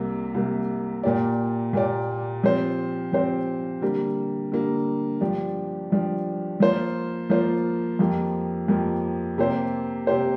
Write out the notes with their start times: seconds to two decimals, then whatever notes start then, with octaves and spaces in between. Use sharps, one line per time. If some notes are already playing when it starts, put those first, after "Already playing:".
Already playing: C2 C3 A#3
0.34 C2 C3 A#3
1.03 A#2 A#3 G4 D5
1.73 A#2 A#3 G4 D5
2.43 F3 C4 G4 C5
3.12 F3 C4 G4 C5
3.82 D3 G3 A#3
4.52 D3 G3 A#3
5.21 G2 F3 D4 G4
5.90 G2 F3 D4 G4
6.60 F3 A#3 F4 C5
7.30 F3 A#3 F4 C5
7.99 F2 F3 A#3 G4
8.68 F2 F3 A#3 G4
9.38 C3 A#3 G4 C5
10.07 C3 A#3 G4 C5